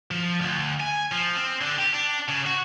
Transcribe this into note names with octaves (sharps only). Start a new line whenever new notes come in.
F3
D2
G#5
F3
C4
D3
G4
D4
C#3
F#4